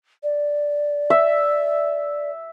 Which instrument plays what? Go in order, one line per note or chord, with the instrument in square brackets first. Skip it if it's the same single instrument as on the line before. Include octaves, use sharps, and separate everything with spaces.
[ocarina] D5
[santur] E5